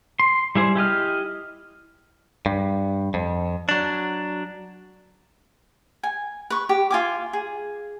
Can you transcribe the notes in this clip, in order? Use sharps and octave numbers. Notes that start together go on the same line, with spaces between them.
C6
G3 E4 G#4 C5
E4 G4 D#5 F6
G2
F2
F#3 D4
G#5
B4 C#6
G4
F4 G#5 D6
G#4